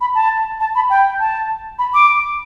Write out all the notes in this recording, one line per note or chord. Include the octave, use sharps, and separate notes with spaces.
B5
A5
A5
B5
G5
A5
B5
D6